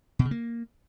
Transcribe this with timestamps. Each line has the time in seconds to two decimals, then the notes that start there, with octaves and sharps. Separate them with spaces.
0.19 B2
0.25 C#3
0.31 A#3